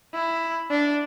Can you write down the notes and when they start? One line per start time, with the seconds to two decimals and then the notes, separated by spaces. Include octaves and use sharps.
0.14 E4
0.70 D4